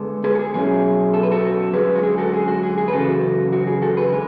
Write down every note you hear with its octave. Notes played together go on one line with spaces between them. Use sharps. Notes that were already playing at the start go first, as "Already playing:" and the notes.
Already playing: D3 G#3 B3 D4
G#4 B4
A4
G#4
B2 F#3 C#4 E4 G#4
A4
B4
F#4 A4
F#2 D3 G#3 G#4 B4
F#4
G#4
F#4 A4
G#4
F#4
G#4
G#4
B4
F#2 C#3 E3 F#4 A4
F#4
G#4
F#4 A4
G#4 B4
D3 G#3